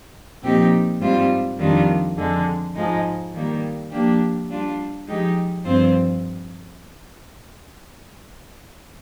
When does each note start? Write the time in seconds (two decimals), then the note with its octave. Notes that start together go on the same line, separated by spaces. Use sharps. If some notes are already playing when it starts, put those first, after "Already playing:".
0.43 A#2 F3 C4 D#4 G4
1.00 G#2 G3 C4 F4
1.59 F2 D#3 G3 D4 F4
2.17 F2 D3 G#3
2.75 G#2 F3 G#3 D#4
3.34 D#3 G3 A#3
3.92 F3 A#3 D4 G4
4.50 G3 D4 F4
5.07 F3 G#3 D#4 G4
5.65 G2 F3 C4 F4 C5